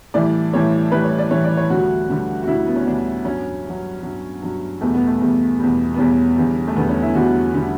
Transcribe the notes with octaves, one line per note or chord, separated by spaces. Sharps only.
A2 E3 G3 D5
A2 E3 G3 C#5
A2 E3 G3 B4
C#5
D5
A2 E3 G3 C#5
D5
C#5
D2 D3 G3 F#4
D2 D3 G3
F#4
D2 D3 G3 E4
B3
C#4
D2 D3 G3 D4
G2 F#3 C#4
G2 F#3
G2 F#3
G2 F#3
E2 B2 G3 A3
B3
A3
E2 B2 G3
E2 B2 G3
B3
E2 B2 G3 C#4
E2 D3 G3
A3
E2 D3 G3 B3
C#4
E4
E2 D3 G3 F#4
D3 G3